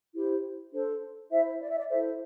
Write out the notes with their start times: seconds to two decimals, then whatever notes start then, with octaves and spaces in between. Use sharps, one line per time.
0.14 E4 G4 C5
0.72 D4 A4 C5
1.31 E4 C5 E5
1.61 D5
1.69 E5
1.78 D5
1.90 E4 A4 C5 E5